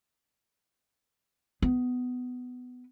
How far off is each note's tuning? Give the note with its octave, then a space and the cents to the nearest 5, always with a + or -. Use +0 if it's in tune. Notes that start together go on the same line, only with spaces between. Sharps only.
B3 +15